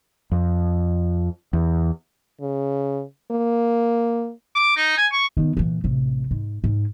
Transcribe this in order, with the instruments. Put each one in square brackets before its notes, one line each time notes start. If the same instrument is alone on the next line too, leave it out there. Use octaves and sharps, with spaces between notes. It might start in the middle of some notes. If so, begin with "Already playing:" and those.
[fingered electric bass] F2
E2
[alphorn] C#3
A#3
[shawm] D6
D#4
G#5
C#6
[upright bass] D#3 B3
A#2 E3
A1 C3
G#2
G#2